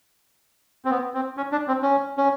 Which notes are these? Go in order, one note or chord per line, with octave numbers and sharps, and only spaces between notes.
C4
B3
C4
C#4
D4
C4
C#4
C#4